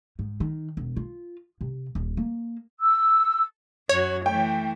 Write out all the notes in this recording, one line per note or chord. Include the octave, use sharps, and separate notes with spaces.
G#2
D#3
E1
F4
C3
D#1
A#3
E6
F#2 F#4 C#5
E3 A3 G5